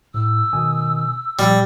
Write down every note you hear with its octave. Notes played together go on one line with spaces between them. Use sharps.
A2 E6
B2 D#3 G#5 D#6
A#2 F3 G3